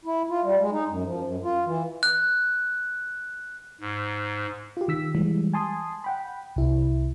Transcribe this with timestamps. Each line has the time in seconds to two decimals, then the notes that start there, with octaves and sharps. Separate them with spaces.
0.05 E4
0.30 F4
0.43 G3
0.58 G#3
0.72 D#4
0.89 F#2
1.04 F3
1.22 F#2
1.43 F4
1.65 E3
2.03 F#6
3.81 G#2
4.77 F4 G4
4.88 D#3 E6 B6
5.15 E3 G3 G#3
5.53 G#5 A5 C6 D#6
6.04 F#5 G5 B5
6.56 C2 E4